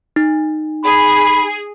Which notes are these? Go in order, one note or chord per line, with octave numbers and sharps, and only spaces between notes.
D#4
G#4 B5